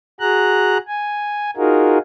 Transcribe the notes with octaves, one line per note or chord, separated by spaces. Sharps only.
F#4 G#4 A#5 F#6
G#5
D#4 F4 F#4 G#4 A#4